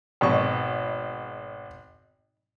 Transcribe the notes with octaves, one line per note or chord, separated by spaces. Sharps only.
G#1 B2 C#6